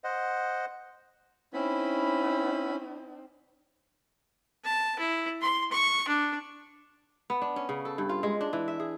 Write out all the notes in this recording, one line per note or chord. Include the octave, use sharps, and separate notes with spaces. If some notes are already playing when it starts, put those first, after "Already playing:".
C5 D#5 F#5
C4 C#4 D#4 E4 B5
A5
E4
C6
C#6
D4
B3
D4
C#4
C#3
A4
G2
F4
G#3
D4
E3
E5
G#4